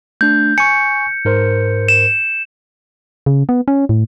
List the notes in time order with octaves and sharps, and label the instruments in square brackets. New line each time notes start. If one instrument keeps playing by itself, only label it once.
[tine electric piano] A3 D4 [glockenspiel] G6
[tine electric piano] G#5 C#6 [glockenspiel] C#7
[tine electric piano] G#2 A#4 C5
[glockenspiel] E7
[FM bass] C#3
B3
C#4
A2